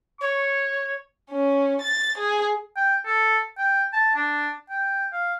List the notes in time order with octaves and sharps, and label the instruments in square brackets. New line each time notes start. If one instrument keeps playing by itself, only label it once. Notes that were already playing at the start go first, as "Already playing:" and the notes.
[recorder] C#5 [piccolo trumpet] C#6
[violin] C#4
A6
G#4
[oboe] G5
A4
G5
A5
D4
G5
F5